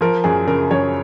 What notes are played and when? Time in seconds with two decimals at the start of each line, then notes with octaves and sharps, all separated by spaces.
0.01 F3 A#4
0.24 F#2 G#4
0.47 C#3 A#4
0.71 F#2 C#5